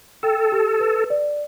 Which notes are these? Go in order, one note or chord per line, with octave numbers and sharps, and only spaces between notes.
A4 G5
G4
B4
D5